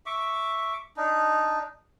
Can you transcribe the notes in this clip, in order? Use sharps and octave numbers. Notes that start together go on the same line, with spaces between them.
E5 C#6 D6
D4 D#4